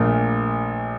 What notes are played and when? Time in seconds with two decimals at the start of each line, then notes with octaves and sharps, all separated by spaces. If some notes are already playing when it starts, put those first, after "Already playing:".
Already playing: A#1 A#2 A3